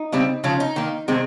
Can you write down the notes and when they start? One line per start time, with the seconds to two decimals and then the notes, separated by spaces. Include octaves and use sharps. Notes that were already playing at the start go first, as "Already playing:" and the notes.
Already playing: D#4
0.12 C#3 G3 C4
0.44 C#3 F3 G#3 C#4
0.60 D#4
0.76 D#3 A#3
1.08 C3 D#3 G#3 C4